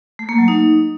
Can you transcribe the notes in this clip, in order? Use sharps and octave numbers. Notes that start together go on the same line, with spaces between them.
A3
A#3
F#3
D#4